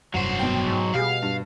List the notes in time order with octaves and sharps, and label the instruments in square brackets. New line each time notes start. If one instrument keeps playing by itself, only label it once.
[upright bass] F1 G2 [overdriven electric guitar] F#3 C5 [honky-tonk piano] F#5
[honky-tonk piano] B2 G5
[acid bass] G#2
[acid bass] B2 [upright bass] G3 F4 [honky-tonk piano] G4 G#4 [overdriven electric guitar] F5
[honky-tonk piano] G2